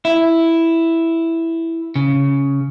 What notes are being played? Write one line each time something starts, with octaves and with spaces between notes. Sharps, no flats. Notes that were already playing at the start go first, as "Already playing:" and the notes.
E4
C#3